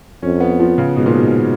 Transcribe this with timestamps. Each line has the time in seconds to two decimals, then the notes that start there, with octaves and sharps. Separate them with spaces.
0.22 F2 C#4
0.40 B3
0.60 F3
0.78 C#3
0.96 G#2 B2
1.06 A#2
1.14 B2